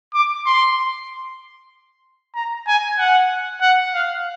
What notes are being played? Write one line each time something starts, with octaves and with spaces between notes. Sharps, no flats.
D6
C6
A#5
G#5
F#5
F#5
F5